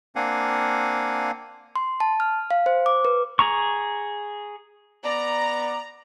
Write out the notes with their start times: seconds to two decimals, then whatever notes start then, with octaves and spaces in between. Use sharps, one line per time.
0.16 A#3 C4 D4 F5 F#5 G#5
1.76 C6
2.00 A5
2.20 F6
2.51 F5
2.66 C5
2.86 D6
3.05 B4
3.39 G#4 A#5 C#6
5.03 B3 D5 A#5